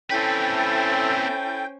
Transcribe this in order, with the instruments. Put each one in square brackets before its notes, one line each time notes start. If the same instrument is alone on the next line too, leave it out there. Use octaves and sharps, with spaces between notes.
[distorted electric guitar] C4 B4 [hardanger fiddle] C#4 C5 [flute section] E4 A4 [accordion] G5